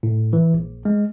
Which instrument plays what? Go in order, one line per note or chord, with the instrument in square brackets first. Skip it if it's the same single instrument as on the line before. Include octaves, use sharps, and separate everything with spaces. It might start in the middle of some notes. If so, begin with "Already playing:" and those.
[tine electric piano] A2
E3
A#1
G#3